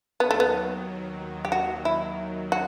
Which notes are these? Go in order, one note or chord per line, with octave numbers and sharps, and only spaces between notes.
D#2 D#3 F#3 B3
A3
B3
G4
F#4
E4
F#4